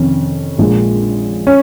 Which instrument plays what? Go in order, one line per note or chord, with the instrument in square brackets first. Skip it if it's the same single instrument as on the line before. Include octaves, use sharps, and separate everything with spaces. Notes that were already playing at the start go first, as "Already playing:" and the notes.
Already playing: [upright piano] F2 C3 D#3 C#4
A#1 A#2 G#3
C#4